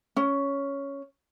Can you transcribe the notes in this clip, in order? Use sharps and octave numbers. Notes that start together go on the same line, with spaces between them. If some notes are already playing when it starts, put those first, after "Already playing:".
C#4